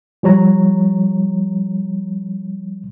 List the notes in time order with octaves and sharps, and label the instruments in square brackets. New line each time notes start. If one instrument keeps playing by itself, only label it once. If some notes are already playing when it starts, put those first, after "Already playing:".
[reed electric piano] F3 G3 C#5 A#5